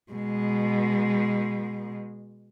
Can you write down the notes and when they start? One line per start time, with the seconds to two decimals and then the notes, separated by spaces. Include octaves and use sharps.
0.12 B2 G#3